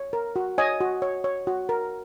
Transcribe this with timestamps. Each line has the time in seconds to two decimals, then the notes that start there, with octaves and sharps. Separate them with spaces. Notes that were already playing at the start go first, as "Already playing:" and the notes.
Already playing: C#5
0.13 A#4
0.36 F#4
0.58 C#5 D#5 G#5
0.80 F#4
1.02 C#5
1.24 C#5
1.47 F#4
1.69 A#4